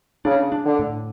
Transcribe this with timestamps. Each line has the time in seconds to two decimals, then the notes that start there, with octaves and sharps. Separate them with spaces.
0.25 C#3 D4
0.52 D4
0.65 D3
0.79 A2